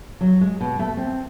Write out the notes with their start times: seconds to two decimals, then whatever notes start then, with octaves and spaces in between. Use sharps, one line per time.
0.21 F#3
0.41 G#3
0.61 B2
0.79 A3
0.97 C4